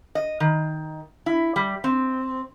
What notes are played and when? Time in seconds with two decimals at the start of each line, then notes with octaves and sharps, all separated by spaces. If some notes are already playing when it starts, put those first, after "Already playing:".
0.15 D#5
0.40 D#3
1.26 E4
1.56 G3
1.84 C4